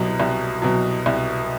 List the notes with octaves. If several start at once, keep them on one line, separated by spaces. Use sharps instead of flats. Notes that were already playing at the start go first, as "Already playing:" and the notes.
Already playing: C2 B2 F#3
C2
B2 F#3
C2